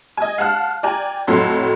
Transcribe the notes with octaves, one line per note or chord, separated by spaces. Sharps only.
D#5 G#5
F5 F#5 A5 F6 F#6
D5 G5 G#5 A#5
F2 A2 F#3 F#4 A4 C6